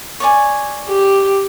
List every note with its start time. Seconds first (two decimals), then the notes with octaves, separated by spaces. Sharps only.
0.20 C#5 D5 G#5
0.88 G4